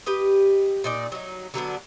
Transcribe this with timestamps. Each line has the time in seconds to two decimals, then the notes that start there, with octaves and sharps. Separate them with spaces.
0.06 G4 B4 D#5
0.84 A#2 D#4 D5
1.12 F#3 D#4
1.54 D3 F#3 B3 D4